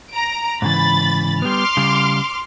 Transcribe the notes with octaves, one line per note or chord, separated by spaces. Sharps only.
A#5 D7
G#2 C#3 E3 B5 A6
G3 B3 C6 D6 F6
C#3 G3